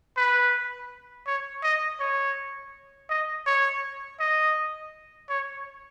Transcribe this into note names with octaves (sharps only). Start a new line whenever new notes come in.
B4
C#5
D#5
C#5
D#5
C#5
D#5
C#5